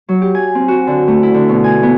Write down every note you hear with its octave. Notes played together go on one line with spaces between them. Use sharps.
F#3
G4
G#5
C4
F#4
D3
A3
E4
D3
B2
G#5
B3